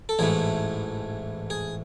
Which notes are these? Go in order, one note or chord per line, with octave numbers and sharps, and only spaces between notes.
A4
A1 G#2 E3 A3 G#4
G#4